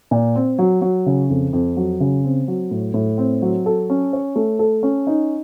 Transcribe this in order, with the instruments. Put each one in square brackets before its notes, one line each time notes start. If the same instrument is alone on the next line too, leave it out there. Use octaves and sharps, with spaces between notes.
[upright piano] A#2
C4
F#3
F#3
C#3
F2
F2
F#3
C#3
C4
F#3
A2
A2
C4
F#3
A4
C#4
C#5
A3
A4
C#4
D#4